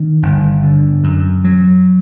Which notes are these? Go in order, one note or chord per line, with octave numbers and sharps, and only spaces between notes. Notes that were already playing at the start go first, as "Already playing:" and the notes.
Already playing: D#3
G1
D3
F#2
F#3